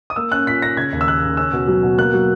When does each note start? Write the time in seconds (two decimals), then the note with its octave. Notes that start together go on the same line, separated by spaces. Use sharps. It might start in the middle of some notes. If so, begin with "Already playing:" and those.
0.10 D#6
0.16 A#3 E6
0.32 C#4 F#6
0.47 A#2 B6
0.62 C#4 A#6
0.77 C#3 G#6
0.93 D#2
1.01 E6
1.07 A#3 F#6
1.23 C#3
1.37 C#4 E6
1.52 B2
1.68 F#3
1.83 B2
1.98 A#3 F#6
2.14 F#3